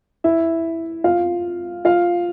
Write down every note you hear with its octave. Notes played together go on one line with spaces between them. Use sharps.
E4 E5
F4 F5
F4 F5